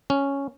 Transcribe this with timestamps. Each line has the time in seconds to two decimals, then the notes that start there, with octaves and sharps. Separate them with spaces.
0.10 C#4